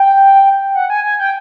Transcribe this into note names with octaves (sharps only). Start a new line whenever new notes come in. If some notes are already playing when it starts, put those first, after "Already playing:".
Already playing: G5
F#5
G#5
G#5
G5